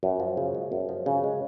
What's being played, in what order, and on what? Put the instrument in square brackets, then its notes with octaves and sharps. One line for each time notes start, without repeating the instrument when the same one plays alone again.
[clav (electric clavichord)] F#2
F3
C#3
G#3
F#2
F3
C#3
G#3